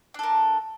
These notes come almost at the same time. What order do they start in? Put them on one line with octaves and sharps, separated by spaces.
D4 A4 A#4